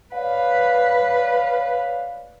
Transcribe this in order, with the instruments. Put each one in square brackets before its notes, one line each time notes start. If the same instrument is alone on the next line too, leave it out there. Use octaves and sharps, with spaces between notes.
[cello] B4 [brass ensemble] C#5 D5 F5